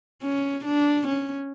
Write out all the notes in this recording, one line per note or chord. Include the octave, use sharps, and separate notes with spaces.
C#4
D4
C#4